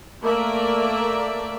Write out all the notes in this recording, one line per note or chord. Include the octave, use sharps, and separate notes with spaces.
A3 A#3 A#4 D5 E5